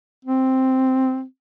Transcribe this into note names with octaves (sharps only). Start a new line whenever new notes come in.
C4